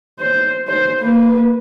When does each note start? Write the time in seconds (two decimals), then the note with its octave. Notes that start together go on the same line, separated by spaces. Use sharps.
0.20 C5
0.68 C5
1.01 A#3 B4